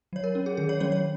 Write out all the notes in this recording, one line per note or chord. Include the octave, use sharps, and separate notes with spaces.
F#3 C#5
A#4
C#4
G#4
D#3 G#4
C#5
F#3 C#4 C#5
C#5